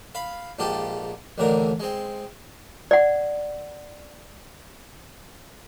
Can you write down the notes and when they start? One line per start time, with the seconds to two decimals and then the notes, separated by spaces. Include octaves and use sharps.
0.15 F5 B5
0.59 A#1 G#2 F4 G4 A4
1.38 A1 D#2 A2 D3 A#4
1.80 G#3 C4
2.91 D5 F#5